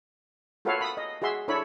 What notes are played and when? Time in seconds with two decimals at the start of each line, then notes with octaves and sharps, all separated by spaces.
0.65 F4 F#4 A4 B4 C#5 F5
0.81 B5 D#6
0.97 D#5
1.22 F#4 G#4 E5 C6
1.48 D4 E4 A4 C#5 B5